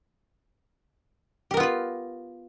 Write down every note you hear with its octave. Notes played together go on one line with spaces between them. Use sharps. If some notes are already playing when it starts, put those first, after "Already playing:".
B3 F4 G4 A#4 B4